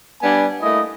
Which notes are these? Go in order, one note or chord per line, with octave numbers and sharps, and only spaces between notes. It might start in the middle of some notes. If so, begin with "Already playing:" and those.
G3 B3 D4 G#5
A3 A#3 E4 D#5